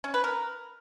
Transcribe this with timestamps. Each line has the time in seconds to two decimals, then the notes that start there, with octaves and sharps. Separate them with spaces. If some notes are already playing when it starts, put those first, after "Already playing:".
0.04 C#4
0.14 B4
0.24 A#4